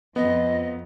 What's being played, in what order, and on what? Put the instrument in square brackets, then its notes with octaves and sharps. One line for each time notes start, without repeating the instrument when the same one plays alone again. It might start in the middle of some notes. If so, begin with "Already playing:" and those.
[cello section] F2 F3 [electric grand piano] B3 [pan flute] D#5